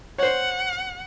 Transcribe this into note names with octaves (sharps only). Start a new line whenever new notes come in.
C5 C#5 F#5